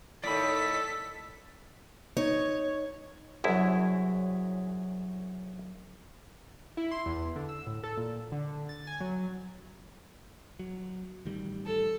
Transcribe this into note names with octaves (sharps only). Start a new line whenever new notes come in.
A2 D#3 A4 D5 B5 B6
D#4 C#5
C2 F#2 F#3 E4 G#4
E4
C6
E2
D3
E6
A2
A4
A#2
D3
A6
G#5
F#3
F#3
A1 D#3 G3
A4